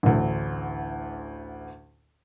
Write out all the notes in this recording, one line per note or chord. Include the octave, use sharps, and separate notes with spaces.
A1 D2